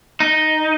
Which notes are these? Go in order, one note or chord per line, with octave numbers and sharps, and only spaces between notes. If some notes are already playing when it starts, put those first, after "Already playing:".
D#4